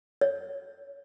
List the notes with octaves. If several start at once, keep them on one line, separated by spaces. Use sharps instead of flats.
C#5